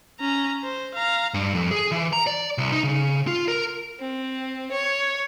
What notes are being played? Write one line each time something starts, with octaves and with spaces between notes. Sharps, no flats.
C#4 A#5
C5
F5 A#5
G2
F2
G#4
E3
A#5
D5
C2
D#4
C#3
F4
A#4
C4
C#5